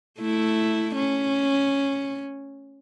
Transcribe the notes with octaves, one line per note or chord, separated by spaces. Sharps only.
A3 E4
C#4